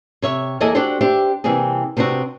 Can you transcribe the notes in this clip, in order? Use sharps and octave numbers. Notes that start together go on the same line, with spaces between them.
C3 C#5 E5
E2 A#3 G#4 A4 D#5 E5
D4 F#4 G4 A4 C5 D5
D4 G4 C5 E5
C3 E3 G3 A#3 C4 G#4
C3 B3 C4 D4 F#4